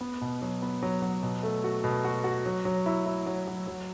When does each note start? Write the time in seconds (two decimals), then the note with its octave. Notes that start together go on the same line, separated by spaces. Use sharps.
0.01 B3
0.21 B2
0.42 F#3
0.62 B3
0.82 F#3
1.02 F#3
1.23 B2
1.43 A3
1.64 F#4
1.84 B2
2.04 F#4
2.24 F#4
2.46 F#3
2.65 F#3
2.86 E4
3.06 E4
3.26 F#3
3.47 F#3
3.67 F#3